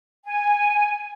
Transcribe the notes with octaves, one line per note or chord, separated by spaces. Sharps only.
G#5